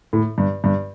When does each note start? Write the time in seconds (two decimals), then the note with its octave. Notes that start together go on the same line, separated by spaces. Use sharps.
0.13 A2
0.38 G2
0.64 G2